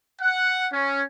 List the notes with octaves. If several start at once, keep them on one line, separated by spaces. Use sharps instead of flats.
F#5
C#4